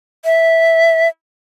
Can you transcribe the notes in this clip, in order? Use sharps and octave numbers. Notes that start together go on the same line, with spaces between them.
E5